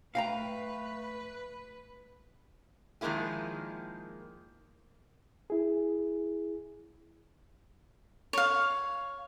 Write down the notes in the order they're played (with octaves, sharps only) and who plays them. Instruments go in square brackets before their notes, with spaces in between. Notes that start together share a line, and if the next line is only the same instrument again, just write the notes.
[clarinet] A3 [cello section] B4 [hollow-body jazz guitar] F5 G5 A#5
[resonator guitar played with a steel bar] D#3 F3 G#3 A#3 E4 G#4
[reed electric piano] E4 G#4
[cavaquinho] C#5 F5